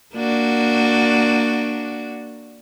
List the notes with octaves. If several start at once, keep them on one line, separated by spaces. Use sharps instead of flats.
A#3 D4 F#4